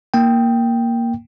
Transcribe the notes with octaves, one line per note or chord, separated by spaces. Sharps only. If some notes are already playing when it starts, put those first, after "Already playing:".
A#3 G5